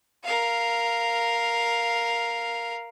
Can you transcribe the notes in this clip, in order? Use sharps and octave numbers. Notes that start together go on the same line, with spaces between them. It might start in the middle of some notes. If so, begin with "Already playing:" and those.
A#4 F5